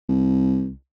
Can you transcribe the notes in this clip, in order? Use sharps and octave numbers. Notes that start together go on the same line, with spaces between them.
C2